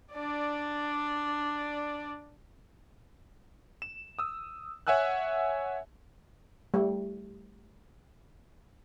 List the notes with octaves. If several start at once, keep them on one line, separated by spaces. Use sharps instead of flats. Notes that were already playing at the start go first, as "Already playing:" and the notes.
D4 D5
E7
D#6 E6
C#5 E5 F#5 G#5 E6 F#6
G3 A3